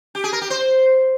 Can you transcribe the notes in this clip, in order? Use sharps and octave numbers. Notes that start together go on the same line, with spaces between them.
G4
G#4
A#4
G4
C5